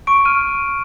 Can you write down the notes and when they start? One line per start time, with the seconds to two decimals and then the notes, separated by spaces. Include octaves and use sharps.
0.07 C#6 D7
0.25 F6 D#7